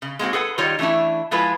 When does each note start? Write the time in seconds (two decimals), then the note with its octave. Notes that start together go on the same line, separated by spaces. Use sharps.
0.02 C#3
0.19 G#3 A#3 C4 F#4
0.33 G#4 A4 B4 F#5
0.58 D#3 G3 D#4 F4 C#5
0.79 E3 A3 C#4 D4 E4
1.31 F3 G#3 E4 F4 B4